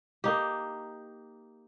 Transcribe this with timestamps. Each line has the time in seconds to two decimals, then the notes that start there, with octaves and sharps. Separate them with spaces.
0.24 A#3 D#4 G4